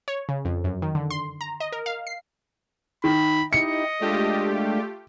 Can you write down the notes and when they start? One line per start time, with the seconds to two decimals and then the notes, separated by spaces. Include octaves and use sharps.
0.08 C#5
0.29 C#3
0.45 F2
0.64 F#2
0.82 D#3
0.95 D3
1.11 C6
1.41 A#5
1.60 D#5
1.72 A#4
1.86 F5
2.07 C7
3.04 D#3 B5
3.53 D#4 E4 G4 D#5 C#7
4.01 G#3 A3 D4 F4 G4